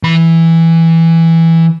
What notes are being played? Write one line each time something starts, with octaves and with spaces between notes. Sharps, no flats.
E3 B5